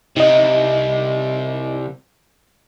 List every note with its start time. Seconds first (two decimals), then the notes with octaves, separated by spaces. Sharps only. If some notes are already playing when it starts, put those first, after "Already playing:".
0.17 C2 C3 D#4 D#5